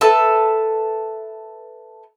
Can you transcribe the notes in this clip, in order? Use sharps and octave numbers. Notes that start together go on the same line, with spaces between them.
A4 B4 E5 A5